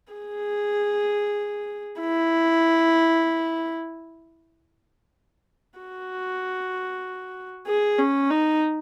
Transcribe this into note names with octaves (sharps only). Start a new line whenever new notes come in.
G#4
E4
F#4
G#4
C#4
D#4